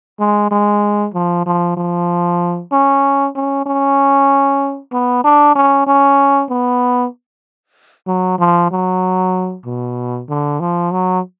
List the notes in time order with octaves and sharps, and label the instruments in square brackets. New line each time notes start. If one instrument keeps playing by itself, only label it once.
[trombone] G#3
G#3
F3
F3
F3
C#4
C#4
C#4
B3
D4
C#4
C#4
B3
F#3
F3
F#3
B2
D3
F3
F#3